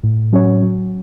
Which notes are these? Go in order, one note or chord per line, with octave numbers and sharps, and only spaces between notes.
A2
F#3 C#4 F#4 C#5
F#3